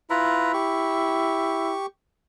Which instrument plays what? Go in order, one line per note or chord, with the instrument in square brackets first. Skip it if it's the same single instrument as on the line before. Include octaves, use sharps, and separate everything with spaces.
[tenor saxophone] E4 [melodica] F4 B4 A#5
[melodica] G4 C#6